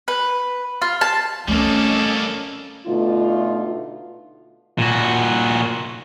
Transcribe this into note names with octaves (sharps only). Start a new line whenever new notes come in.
B4
F4
A5
G3 A3 A#3 C4 C#4 A4 D#5 A5
B2 D3 A3 D#4 F4
A#2 F#4